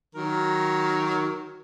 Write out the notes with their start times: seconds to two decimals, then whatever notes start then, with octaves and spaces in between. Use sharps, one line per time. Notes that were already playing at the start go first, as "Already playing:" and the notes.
0.15 D#3 F#3 A#4